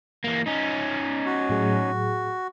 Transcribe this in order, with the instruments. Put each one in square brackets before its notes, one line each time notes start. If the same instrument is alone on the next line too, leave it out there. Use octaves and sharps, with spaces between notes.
[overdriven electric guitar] E3 A#3
C#4 D#4
[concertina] F#4
[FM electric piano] A2 F#3 G#4